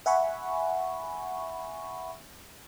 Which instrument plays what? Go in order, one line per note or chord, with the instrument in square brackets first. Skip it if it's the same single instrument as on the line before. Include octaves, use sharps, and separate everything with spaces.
[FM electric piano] E5 F#5 G#5 B5 C#6